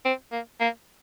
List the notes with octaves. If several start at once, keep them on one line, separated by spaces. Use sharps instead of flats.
C4
A#3
A#3